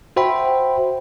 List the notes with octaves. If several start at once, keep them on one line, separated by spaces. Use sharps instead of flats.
F#4 C5 E5 G5 B5